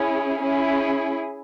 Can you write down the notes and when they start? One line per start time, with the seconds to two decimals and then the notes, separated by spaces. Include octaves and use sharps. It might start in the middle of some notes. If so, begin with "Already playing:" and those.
Already playing: C#4 E4 G#4
0.41 C#4 E4 G#4